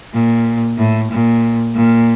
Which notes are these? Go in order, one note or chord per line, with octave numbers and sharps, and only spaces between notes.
A#2
A2
A#2
A#2